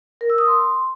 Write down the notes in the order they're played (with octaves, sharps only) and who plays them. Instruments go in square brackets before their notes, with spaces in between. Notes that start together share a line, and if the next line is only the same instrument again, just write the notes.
[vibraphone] A#4
E6
D#6
C6